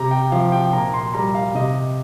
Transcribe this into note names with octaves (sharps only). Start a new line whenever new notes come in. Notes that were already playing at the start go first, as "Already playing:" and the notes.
Already playing: C3 A#5
G5
F3 F5
G5
A#2 A#5
C6
G3 A#5
F5
C3 D#5